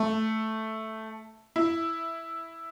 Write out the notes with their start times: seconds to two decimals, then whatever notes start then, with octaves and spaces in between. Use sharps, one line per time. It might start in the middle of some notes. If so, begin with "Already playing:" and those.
Already playing: A3
1.56 E4